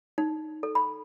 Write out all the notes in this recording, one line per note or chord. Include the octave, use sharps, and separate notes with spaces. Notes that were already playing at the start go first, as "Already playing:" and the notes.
D#4
A4
B5